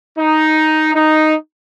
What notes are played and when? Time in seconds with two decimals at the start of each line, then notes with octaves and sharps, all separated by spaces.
0.18 D#4
0.95 D#4